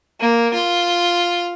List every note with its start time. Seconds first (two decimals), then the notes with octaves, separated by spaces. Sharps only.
0.20 A#3
0.54 F4